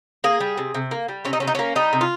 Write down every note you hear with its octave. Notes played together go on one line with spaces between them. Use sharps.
A#3 G#4
G3
C3
C3
A#3
G3
C3 C#4
D#4
C3 C#4
D#4
A#3 C#4
G3 D#4
C3
F4